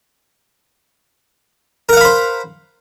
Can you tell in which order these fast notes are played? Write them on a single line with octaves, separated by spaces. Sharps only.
A#4 F#5 F5 B5 C5